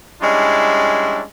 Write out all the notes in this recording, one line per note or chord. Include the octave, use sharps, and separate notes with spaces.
G3 G#3 C#4 D4 E4